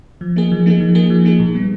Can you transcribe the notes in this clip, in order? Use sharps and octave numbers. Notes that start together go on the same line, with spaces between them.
F3
A#3 D#4 G#4
F3
A#3 D#4 G#4
F3
A#3 D#4 G#4
F3
A#3 D#4 G#4
A#2
G3 B3